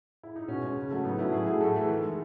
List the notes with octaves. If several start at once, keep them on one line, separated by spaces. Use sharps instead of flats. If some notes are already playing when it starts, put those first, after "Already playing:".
E4
D#4
B2 C#4
G#3
C#3
F#3 A3
A2 B3 D#4
F#3 A3 C#4 E4
A2 E4 G#4
F#3 A3 E4 G#4
A2 F#4 A4
E3 A3
D#3
G#3